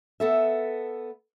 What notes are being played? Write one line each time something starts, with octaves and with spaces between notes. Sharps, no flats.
B3 A4 E5